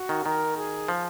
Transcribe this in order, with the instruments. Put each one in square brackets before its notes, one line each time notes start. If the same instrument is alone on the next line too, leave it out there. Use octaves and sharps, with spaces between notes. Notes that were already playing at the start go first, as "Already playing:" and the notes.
Already playing: [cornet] F#4
[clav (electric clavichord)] D#3
[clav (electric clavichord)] D#3 [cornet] A#4
[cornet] G#4
[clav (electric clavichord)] F3